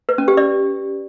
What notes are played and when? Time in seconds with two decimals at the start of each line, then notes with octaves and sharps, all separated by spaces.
0.09 B4
0.18 C#4
0.28 G4
0.37 D5